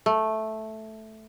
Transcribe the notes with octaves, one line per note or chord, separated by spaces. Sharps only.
A3